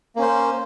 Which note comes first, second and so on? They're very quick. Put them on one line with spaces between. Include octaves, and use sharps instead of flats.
A#3 C#4 C5